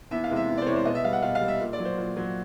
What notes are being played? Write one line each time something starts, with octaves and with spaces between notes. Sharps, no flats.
E2 E5
F5
C3 E3 G#3
E5
E2
C5 D5
C3 E3 G#3 C#5
C5
B2 D#5
E5
G3 F5
F#5
B2 F5
F5
G3
E5
A#2
D5
F#3
C5
A#2
F#3